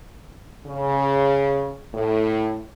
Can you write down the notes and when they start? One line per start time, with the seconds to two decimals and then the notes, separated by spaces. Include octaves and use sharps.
0.66 C#3
1.94 A2